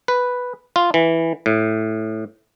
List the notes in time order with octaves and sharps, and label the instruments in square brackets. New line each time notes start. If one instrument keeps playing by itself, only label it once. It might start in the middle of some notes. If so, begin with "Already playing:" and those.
[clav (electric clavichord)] B4
F4
E3
A2